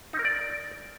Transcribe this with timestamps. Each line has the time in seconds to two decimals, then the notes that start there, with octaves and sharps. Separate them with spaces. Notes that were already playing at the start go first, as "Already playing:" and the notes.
0.13 D#4
0.19 A#4
0.25 D5